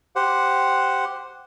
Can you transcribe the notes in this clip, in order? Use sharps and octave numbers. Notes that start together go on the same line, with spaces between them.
G4 C5 F#5